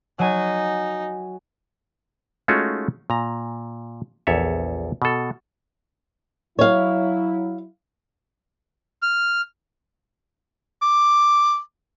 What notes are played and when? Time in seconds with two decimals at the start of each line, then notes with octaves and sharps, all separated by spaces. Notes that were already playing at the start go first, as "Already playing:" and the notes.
0.19 F#3 D#4 G#5
2.48 G#3 A3 C#4 D#4 F4 F#4
3.10 A#2 A#5
4.27 A#1 E2 A4 C#5 E5
5.02 B2 A4
6.59 F#3 E4 C#5 F5
9.02 F6
10.82 D6